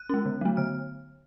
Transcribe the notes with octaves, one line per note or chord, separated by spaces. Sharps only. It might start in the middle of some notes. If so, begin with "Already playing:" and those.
Already playing: F#6
G#3 C#4
D3
F#3 A3
D3 F6